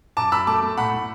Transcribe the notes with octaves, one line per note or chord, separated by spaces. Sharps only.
F#2 A5 D6
F#2 B5 E6
A3 A5 D6
A3
A2 F#5 B5
A2